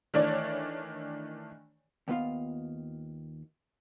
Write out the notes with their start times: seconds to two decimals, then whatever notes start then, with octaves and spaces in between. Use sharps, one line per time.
0.14 D#3 E3 A3 D4 C#5 D5
2.08 D#2 B3 F4 F5